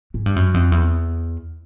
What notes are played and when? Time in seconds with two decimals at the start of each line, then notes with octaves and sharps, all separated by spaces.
0.14 G#2
0.26 G2
0.36 F#2
0.54 F2
0.72 E2